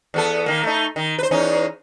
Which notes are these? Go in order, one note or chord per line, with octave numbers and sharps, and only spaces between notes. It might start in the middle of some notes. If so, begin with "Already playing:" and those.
E2 B3 A4
D#3 A#3
A3 D#4
D#3
B4 C5
E2 C#4 D#4